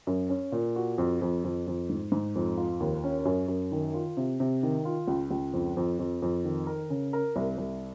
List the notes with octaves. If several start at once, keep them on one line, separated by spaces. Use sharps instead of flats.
F#2
C#4
A#2
F#4
F2
F2
F2
F2
G#2
G#2
F2
F4
D#2
C#4
F#2
F#2
D#3
F4
C3
C3
D#3
F4
C#2
C#2
F2
F2
F2
F2
D#3
A#4
C#3
A#4
C2
C2